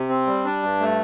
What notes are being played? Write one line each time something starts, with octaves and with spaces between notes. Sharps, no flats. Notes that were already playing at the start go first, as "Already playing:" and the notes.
Already playing: C3
C4
G3
D4
G2
A3